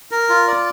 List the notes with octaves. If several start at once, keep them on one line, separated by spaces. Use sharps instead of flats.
A#4
F4
D5